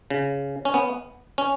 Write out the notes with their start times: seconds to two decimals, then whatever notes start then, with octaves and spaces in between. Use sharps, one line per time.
0.10 C#3
0.65 C#4
0.74 B3
1.38 C#4